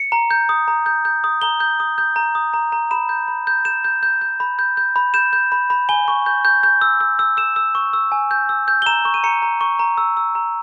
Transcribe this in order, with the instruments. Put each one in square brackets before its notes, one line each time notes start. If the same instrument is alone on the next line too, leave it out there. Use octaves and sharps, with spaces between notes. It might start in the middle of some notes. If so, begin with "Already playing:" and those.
Already playing: [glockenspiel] C#7
A#5
G6
D#6
A#5
G6
G6
D#6
A#5 G7
G6
D#6
G6
A#5
D#6
A#5
A#5
B5 E7
G6
B5
G6
G6 E7
G6
G6
G6
B5
G6
G6
B5
G6 E7
G6
B5
B5
G#5 G7
C#6
G6
G6
G6
E6
E6
E6
E6 E7
E6
C#6
E6
G#5
G6
E6
G6
G7
A#5 E7
C#6
D#7
A#5 C#7
A#5
C#6
A#5
E6
E6
A#5